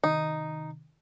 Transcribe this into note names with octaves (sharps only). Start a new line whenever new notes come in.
C3 D#3 D#4